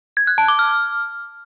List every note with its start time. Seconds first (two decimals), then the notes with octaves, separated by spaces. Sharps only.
0.17 G#6
0.27 F#6
0.38 A5
0.48 D6
0.59 F6